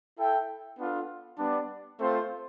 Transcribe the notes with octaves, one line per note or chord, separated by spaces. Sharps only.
E4 A4 E5 G5
B3 D4 F4 A4
G3 B3 D4
A3 C4 F4 C5